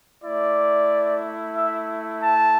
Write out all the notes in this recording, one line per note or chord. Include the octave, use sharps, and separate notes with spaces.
A3 E4 D5
E5
A5